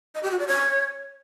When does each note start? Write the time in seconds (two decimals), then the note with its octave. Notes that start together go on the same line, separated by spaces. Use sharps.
0.15 D#5
0.23 G4
0.31 F#4
0.39 D5
0.48 C#5